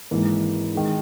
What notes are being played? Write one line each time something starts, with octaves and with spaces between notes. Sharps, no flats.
G#1 G#2 E3 A#3 E4
D#3 G#3 D#4